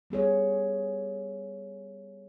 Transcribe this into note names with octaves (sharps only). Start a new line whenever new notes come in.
G3 B3 G#4 C#5